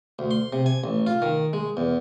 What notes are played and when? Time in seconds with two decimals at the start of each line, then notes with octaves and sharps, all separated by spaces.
0.19 D2
0.31 C6
0.53 C3
0.66 G#5
0.84 A1
1.07 F4
1.22 D#3
1.53 G#3
1.77 E2